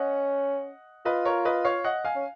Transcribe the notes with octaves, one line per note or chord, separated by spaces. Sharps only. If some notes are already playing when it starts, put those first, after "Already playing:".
Already playing: C#4 D#5 F#5
F4 B4 D#5
A#4 C#5
B4 D#5
C#5 F5
D#5 F#5
F5 G#5
C#4